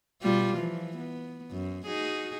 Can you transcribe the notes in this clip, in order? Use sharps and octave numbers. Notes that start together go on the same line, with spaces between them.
B2 G3 F4
E3 F3
B3
F#2
D#4 F#4 G#4